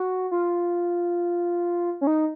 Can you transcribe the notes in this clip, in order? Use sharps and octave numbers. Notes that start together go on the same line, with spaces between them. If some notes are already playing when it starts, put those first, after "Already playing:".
Already playing: F#4
F4
C#4
D#4